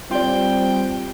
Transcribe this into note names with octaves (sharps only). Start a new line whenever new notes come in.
G3 C4 F4 D5 G5